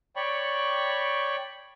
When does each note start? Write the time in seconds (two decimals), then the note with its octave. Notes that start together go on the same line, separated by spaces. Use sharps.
0.16 C#5 D5 G5 B5 C#6